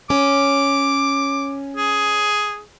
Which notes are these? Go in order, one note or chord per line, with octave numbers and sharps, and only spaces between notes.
C#4 D6
G#4